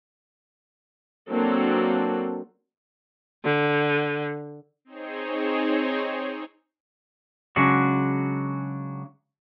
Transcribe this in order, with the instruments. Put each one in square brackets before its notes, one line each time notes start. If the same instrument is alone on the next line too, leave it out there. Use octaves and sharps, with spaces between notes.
[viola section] F#3 A#3 C4 D4 A4
[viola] D3
[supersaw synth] C4 D#4 G#4 C5 C#5
[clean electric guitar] C#3 F#3 G#3 D4 F#4